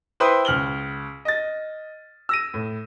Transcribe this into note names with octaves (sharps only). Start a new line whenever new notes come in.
E4 B4 C5 G5 C6 D#6
C#2 F6 F#7 G7
D#5 A6
E6 A#6 D#7
A2